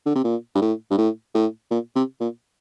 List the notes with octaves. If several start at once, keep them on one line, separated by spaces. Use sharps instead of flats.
D3
C3
A#2
G2
A2
G2
A2
A2
A#2
C3
A#2